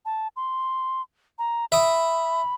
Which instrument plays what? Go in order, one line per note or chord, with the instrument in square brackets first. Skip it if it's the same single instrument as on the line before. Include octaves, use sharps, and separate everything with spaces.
[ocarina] A5
C6
A#5
[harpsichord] E5 D#6 [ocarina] B5